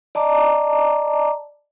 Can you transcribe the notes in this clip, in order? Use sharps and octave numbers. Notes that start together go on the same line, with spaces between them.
D5 D#5 A5 A#5 D6